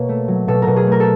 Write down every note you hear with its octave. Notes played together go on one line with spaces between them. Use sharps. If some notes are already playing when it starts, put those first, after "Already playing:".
Already playing: B2 A#3 C#5
A3
F#3
B2 A4
B2 A#4
G#4
A3 A#4
A4